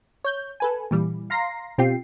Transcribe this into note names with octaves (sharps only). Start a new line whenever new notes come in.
C#5 G6
A4 B4 G#5
A#2 E3 G3
F5 A#5 C6 A#6 C7
B2 C4 F4 G4 G5 C7